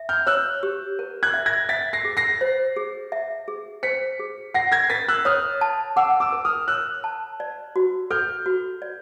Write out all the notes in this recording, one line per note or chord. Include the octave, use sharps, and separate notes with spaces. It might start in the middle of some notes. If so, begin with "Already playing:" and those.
Already playing: E5
F6 G6
C#5 E6 F#6
G4
A#4
F#6 G#6
E5
G#6 A#6
E5 A6 B6
A#6 C7
G#4
A#6 C7
C5
G#4
E5
G#4
C5 B6 C#7
G#4
F#5 A#6 C7
G#6 A#6
A#4 A6 B6
E6 F#6
C#5 D#6 F6
A5
F#5 D6 E6
D6 E6
A#4
D#6 F6
C#5 E6 F#6
A5
D5
F#4
A4 F6 G6
F#4
D5